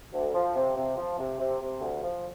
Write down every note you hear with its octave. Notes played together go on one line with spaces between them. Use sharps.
D2
F3
C3
C3
F3
C3
C3
C3
D2
F3